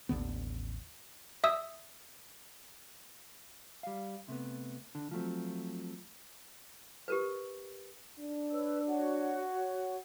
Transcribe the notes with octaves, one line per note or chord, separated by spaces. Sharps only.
A1 D#2 D3 B3
E5 D#6 E6
G3 F5
C3 A3 B3
D3
F3 F#3 A3 C4
G4 A#4 B4
D4
B4 C#5 E6
F#4 C#5 F#5